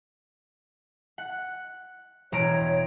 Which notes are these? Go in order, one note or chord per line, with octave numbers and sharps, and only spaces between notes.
F#5
E1 C#5 A#5 D7